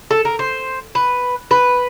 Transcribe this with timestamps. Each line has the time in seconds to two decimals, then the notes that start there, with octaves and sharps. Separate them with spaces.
0.11 A4
0.25 A#4
0.39 C5
0.95 B4
1.51 B4